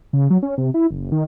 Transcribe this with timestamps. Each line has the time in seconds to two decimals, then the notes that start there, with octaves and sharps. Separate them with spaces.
0.13 C#3
0.30 F#3
0.43 C#4
0.58 C3
0.74 E4
0.91 F#1
1.12 D#3